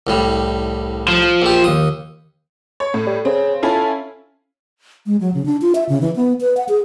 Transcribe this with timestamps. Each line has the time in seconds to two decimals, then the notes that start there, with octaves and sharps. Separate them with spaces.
0.07 C2 A2 G3
1.08 F3
1.42 A#1 G4
1.64 D#2 D#6
2.80 C#5
2.94 A2
3.07 G3
3.25 C#3 C4
3.63 C#4 E4 F4 A4
5.06 G#3
5.21 F#3
5.34 C#3
5.46 D4
5.62 F4
5.75 E5
5.89 C#3
6.01 E3
6.16 B3
6.41 B4
6.57 F#5
6.69 G#4